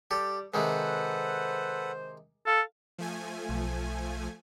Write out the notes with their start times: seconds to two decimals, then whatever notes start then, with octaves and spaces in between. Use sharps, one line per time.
0.11 G3 G4 A4
0.54 C3 D#3 G#3 A4 B4 C5 F#5
2.47 A4 F5
2.98 F3 A3 G#5
3.49 B1